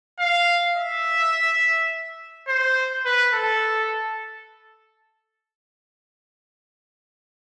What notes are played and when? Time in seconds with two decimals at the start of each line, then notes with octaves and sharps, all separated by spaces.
0.20 F5
0.76 E5
2.48 C5
3.05 B4
3.34 A4